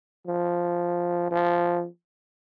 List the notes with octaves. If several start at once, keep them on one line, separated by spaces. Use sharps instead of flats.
F3
F3